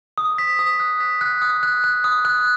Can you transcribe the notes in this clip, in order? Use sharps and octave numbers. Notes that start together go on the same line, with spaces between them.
D#6
B6
D#6
F#6
B6
F#6
D#6
F#6
F#6
D#6
F#6